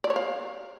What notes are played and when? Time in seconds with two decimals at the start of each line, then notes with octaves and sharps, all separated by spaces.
0.04 D5
0.10 C#5
0.16 F5